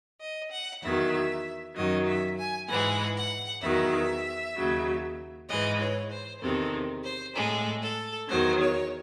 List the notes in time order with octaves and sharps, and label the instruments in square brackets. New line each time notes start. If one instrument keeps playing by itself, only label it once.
[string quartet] D#5
F#5
E2 D#3 F#3 E5
F#2 D#3 F#3 D#5
E5
G#5
G#2 E3 G#3 F#5
F#5
E2 D#3 F#3 E5
D#2 C#3 F#3
G#2 E3 G#3 D#5
C#5
C5
E2 C3 D#3 A4
C5
A2 G#3 A4
A4
E2 D#3 F#3 C5
C#5